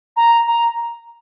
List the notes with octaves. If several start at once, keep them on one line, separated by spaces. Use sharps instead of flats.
A#5
A#5